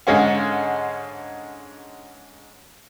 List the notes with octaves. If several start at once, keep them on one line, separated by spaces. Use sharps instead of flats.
G#2 D3 G#3 C#4 F5